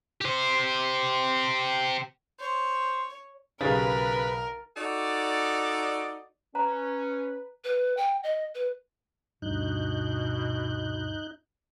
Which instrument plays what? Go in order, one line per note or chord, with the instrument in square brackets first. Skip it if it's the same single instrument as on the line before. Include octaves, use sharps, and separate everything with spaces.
[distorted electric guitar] G4 C5
[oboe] C5 [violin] C#5
[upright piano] B1 G4 A6 [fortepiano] C#3 [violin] A#4 [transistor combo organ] B4
[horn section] D#4 F#4 A4 D5
[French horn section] C#4 [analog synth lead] B4 [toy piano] A#5
[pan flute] B4
G5
D#5
B4
[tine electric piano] D2 G2 [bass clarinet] B2 [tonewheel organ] D#4 F#6 G6